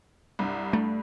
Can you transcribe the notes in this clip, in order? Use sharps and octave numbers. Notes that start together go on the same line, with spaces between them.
C2 G2
G2 A3